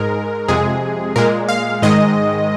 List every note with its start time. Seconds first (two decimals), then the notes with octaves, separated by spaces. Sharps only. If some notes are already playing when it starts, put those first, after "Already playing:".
Already playing: G#2 G#3 A#4
0.48 F2 C3 G#3 G#4
1.16 A#2 G#3 A#4
1.49 F5
1.82 G#2 D#3 G#3 D#5